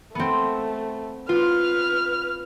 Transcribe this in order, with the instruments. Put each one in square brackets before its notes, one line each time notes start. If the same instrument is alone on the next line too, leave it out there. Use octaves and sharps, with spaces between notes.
[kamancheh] A3 [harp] B3 C4
[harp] F4 [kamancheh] B4 F6